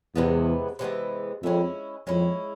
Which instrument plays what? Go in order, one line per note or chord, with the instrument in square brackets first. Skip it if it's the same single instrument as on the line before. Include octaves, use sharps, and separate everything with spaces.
[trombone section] E2 [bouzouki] C3 E3 G#3 B3
[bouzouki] C3 E3 G#3 B3
[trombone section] F2 [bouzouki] G#3 C#4 E4
[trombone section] F2 [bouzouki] G#3 C#4 E4